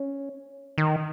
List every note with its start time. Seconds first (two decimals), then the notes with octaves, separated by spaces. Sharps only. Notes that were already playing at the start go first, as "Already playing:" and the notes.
Already playing: C#4
0.78 D#3